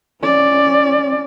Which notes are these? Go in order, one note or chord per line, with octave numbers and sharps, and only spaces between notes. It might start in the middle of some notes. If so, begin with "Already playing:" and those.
C#4 D5